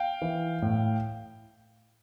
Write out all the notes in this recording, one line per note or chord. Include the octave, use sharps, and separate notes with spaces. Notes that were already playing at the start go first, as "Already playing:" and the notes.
Already playing: F5 G5
E3
A2